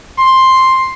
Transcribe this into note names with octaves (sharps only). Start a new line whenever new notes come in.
C6